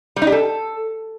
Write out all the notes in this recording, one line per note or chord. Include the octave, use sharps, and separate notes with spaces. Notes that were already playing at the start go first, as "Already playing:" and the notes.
G3
D#4
G4
A4